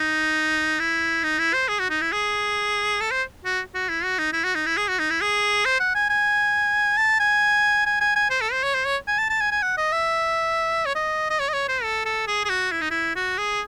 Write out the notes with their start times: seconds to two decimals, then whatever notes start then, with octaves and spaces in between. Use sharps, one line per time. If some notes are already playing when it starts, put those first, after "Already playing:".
Already playing: D#4
0.80 E4
1.24 D#4
1.39 E4
1.53 C5
1.68 G#4
1.79 F#4
1.90 D#4
2.01 E4
2.12 G#4
3.00 A4
3.11 C5
3.45 F#4
3.74 F#4
3.89 E4
4.04 F#4
4.18 D#4
4.33 E4
4.44 F#4
4.55 D#4
4.66 E4
4.77 G#4
4.88 F#4
4.99 D#4
5.10 E4
5.21 G#4
5.65 C5
5.80 F#5
5.95 G#5
6.10 G#5
6.98 A5
7.20 G#5
7.86 G#5
8.01 G#5
8.16 G#5
8.30 C5
8.41 A4
8.52 C5
8.63 C#5
8.75 C5
8.85 C#5
9.07 G#5
9.18 A5
9.30 A5
9.41 G#5
9.52 G#5
9.62 F#5
9.77 D#5
9.92 E5
10.86 C#5
10.95 D#5
11.30 D#5
11.39 C#5
11.49 D#5
11.53 C#5
11.68 C5
11.83 A4
12.05 A4
12.27 G#4
12.45 G#4
12.49 F#4
12.71 E4
12.81 D#4
12.91 E4
13.16 F#4
13.38 G#4